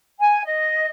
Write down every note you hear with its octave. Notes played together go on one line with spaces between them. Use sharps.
G#5
D#5